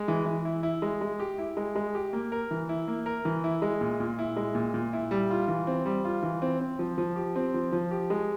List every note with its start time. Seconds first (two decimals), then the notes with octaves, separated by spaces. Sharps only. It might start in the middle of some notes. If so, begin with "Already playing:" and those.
Already playing: G#3
0.08 E3
0.26 E3
0.45 E4
0.63 E4
0.82 G#3
1.01 G#3
1.20 G4
1.38 E4
1.57 G#3
1.76 G#3
1.95 G4
2.13 A#3
2.32 A#4
2.51 E3
2.69 E4
2.88 A#3
3.06 A#4
3.25 E3
3.44 E4
3.62 G#3
3.81 A#2
4.00 A#2
4.19 E4
4.36 G#3
4.55 A#2
4.74 A#2
4.93 E4
5.11 G3
5.30 F4
5.48 E3
5.67 C4
5.86 G3
6.05 F4
6.23 E3
6.42 C4
6.61 C4
6.79 F3
6.98 F3
7.16 G4
7.36 C4
7.54 F3
7.72 F3
7.91 G4
8.10 G#3